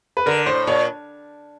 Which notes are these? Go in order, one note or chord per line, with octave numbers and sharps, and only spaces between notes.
B4
D3 A#4
A2 C5
A#2 C#5